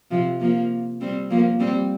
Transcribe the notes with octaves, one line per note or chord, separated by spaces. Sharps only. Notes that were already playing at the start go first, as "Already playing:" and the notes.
C3 F3
F3 A#3
G3 C4
F3 A#3
G3 C4